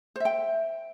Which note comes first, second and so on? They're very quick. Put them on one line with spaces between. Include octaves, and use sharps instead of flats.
C5 E5 G5